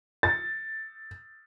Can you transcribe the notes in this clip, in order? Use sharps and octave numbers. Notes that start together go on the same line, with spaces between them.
A6